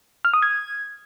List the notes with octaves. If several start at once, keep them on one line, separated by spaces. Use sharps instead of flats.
F6
D#6
G#6